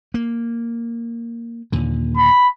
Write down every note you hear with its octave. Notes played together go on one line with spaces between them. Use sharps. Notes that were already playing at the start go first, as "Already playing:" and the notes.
A#3
D#2 A#2 D3
B5